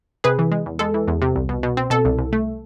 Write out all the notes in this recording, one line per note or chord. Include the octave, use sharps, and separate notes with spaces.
C3 G#4 B4
E3
G#3
E2
G#3 A4
E3
E2
C3
C2
B2
B2
C4
B2 A4
C2
C2
A3